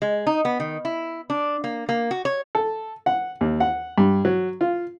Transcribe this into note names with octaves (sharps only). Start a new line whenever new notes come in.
G#3
D#4
B3
D#3
E4
D4
A#3
A#3
F#4
C#5
A4
F#5
D#2
F#5
G2
F#3
F4